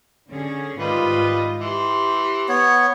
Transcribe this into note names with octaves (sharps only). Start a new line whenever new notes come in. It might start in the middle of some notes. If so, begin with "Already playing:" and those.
D3 C#4 G#4
G#2 D#3 G3 F4 B4 D#5
E3 G4 C6
B3 C#5